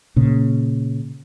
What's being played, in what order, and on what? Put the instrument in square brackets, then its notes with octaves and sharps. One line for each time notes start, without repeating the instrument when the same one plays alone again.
[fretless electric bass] A#2 C#3